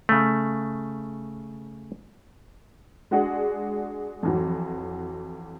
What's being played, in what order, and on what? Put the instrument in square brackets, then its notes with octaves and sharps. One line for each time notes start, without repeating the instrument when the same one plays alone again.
[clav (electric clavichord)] C#3 A3
[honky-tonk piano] G#3 D4 F#4 G#4 F#5
F2 E3 F#3